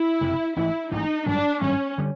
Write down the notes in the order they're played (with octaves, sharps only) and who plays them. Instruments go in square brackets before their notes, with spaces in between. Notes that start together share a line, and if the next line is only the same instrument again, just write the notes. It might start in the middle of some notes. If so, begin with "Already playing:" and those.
Already playing: [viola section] E4
[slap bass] F#1 F2 C3
[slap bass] A1 G#2 E3 [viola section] E4
[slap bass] A1 G#2 E3 [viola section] D#4
[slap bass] G#1 G2 D#3 F#3 [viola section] D4
[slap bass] G#1 G2 D#3 F#3 [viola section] C#4
[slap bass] D3 G3